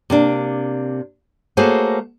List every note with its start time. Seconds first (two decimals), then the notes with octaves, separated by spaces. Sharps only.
0.10 C3 A#3 D4
1.57 A3 A#3 F#4 G#4 C5 C#5